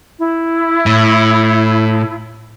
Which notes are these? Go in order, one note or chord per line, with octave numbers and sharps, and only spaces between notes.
E4
A2